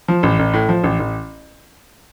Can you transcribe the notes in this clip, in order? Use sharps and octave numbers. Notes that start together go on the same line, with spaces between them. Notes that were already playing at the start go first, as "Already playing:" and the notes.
F3
A1
A1
A2
F3
A1
A1